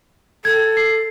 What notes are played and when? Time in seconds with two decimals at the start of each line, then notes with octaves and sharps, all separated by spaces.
0.45 A4 G#6
0.77 C7